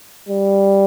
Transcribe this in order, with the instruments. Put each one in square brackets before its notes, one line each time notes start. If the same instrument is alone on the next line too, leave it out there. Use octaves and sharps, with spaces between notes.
[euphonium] G3